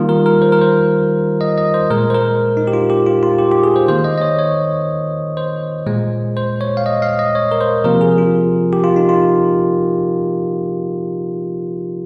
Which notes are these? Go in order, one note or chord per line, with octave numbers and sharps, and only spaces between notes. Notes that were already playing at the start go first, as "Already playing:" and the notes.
Already playing: D#3 G3 A#3 F4
A#4
A#4
C5
A#4
C5
D#5
D#5
C5
A#2 G#3 A#4
C5
A#4
D#4
G4
F4
G4
F4
F4
G4
G4
G#4
C5
D#3 A#3 C5
D#5
D#5
C#5
C#5
C5
A#2 G#3
C5
C#5
F5
D#5
F5
D#5
C#5
A#4
C5
C3 F3 A#3 A#4
G#4
F4
G4
F4
D#4
F4